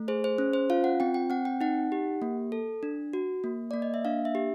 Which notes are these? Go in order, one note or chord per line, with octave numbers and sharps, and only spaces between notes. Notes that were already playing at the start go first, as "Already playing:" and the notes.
Already playing: A3
G#4 C5
C5
C#4
C5
F4 F5
F#5
C4 G5
G5
C4 F#5
G5
D#4 F#5
G4
A#3
A4
D4
F#4
A#3
A#3 D5
D#5
E5
D4 F5
E5
G4